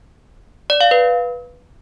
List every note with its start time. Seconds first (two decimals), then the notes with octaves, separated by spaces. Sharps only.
0.70 D5
0.81 F5
0.91 B4